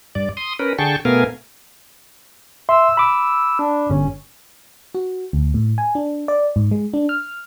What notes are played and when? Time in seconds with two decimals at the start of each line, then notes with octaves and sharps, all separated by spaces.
0.15 G2 D5
0.37 C6 D#6
0.59 C#4 A#4 B4
0.79 D3 G#4 G5 A5 C#6
1.05 B2 A3 B3 A#4 F5 G#5
2.69 E5 C6 E6
2.97 B5 D6
3.59 D4
3.90 G1 C#4
4.95 F#4
5.33 D2
5.54 A2
5.78 G#5
5.95 D4
6.28 D5
6.56 G#2
6.71 G#3
6.94 D4
7.09 F6